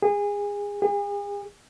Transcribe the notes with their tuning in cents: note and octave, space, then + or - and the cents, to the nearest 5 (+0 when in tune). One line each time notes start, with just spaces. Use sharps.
G#4 -25
G#4 -40